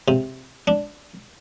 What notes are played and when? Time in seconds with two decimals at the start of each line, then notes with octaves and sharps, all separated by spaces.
0.08 C3
0.67 D4